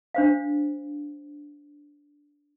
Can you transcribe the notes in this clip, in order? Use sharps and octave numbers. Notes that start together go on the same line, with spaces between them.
D4 C5 F5